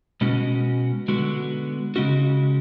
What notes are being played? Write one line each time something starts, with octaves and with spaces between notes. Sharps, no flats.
B2 G#3 C#4 F#4
D3 G#3 B3 F#4
C#3 G#3 C#4 F#4